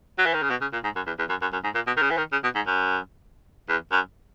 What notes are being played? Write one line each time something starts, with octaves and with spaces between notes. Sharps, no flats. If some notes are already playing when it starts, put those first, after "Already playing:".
F#3
E3
D#3
C#3
B2
C#3
A#2
G#2
F#2
E2
E2
F#2
F#2
F#2
G#2
A#2
B2
D#3
C#3
E3
D#3
C#3
B2
G#2
F#2
E2
F#2